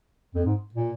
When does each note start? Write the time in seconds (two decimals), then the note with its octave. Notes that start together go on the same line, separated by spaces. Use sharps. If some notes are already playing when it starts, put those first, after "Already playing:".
0.35 F2
0.45 G#2
0.74 A#2